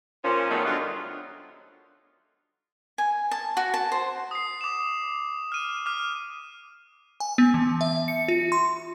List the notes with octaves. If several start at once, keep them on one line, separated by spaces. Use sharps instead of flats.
A#2 F3 C#4
D#3 F3 F#3 G#3 A3 B3
D3 F#3 G3 D#4 F4
G#5
A5
F#4
A5
C5
D#6 C7
D6 E7
F6 D#7
D6 F6
G#5
B3
E3
E5
C#7
F4
C6